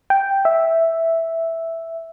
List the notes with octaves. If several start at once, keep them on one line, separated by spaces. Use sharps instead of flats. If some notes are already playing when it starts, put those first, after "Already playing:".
G5
E5